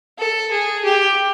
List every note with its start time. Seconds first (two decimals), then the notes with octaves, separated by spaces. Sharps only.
0.18 A4
0.51 G#4
0.84 G4